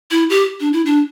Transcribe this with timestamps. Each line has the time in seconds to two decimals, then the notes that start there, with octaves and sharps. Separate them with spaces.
0.11 E4
0.30 G4
0.60 D4
0.73 E4
0.86 D4